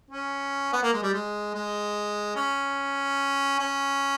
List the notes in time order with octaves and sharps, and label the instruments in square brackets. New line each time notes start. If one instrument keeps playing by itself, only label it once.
[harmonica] C#4
B3
A#3
G#3
G3
G#3
G#3
C#4
C#4